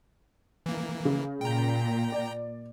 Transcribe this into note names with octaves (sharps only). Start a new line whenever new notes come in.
E3 A#3
C#3
A#2 G5 A#5
D5